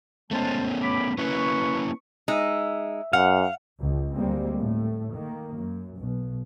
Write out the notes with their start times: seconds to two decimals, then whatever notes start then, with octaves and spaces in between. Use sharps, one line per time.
0.31 G#3 A3 B3 C#4 C5 A5
0.82 C#5 B5 D6
1.18 A#3 C#4 E4 B4 C#6
2.28 G#3 D#4 E5
3.13 F#2 F5 F#5
3.79 C#2
4.14 D2 G3 G#3 A#3 C4
4.59 A2 A3
5.15 D#3 A#3
5.58 F#2
5.98 B1 B2